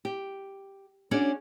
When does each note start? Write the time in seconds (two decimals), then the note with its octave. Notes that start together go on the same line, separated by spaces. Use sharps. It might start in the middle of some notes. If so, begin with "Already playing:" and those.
0.05 G4
1.11 C#4 D4 F#4 G#4 D5